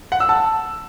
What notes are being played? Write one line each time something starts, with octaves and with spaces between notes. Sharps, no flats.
F#5
E6
A5